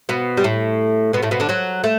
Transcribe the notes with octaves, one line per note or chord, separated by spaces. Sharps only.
B2 B3
G3
A2 A3
B2 B3
A2 A3
B2 B3
D3 D4
F#3 F#4
A3